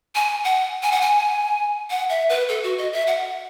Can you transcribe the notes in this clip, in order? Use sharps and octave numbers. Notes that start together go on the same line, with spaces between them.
G#5
F#5
G#5
F#5
G#5
F#5
E5
B4
A4
F#4
D#5
E5
F#5